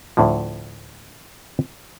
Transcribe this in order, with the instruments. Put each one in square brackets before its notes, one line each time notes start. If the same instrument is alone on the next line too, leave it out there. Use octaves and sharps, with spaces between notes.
[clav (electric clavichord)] D2 A2 D3 F3